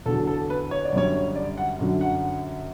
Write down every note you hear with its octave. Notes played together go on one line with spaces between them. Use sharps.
E2 D3 F#3 A4
A4
B4
C#5
D5
F#2 D3 G3 C#5
D5
F#5
F#2 D3 F#3
F#5